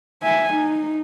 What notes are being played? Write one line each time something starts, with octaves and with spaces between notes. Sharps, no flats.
E5 G#5
D#4